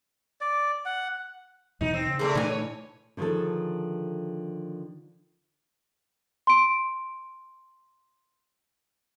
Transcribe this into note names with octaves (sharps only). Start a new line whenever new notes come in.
D5
F#5
D#2 B2 E3 D#4
C4
C#3
C3 G#3 A3 C4 A#4 D5
A#2 D3 E3 A3 G#5
C#5
D3 D#3 F3 G#4 A4
C6 D7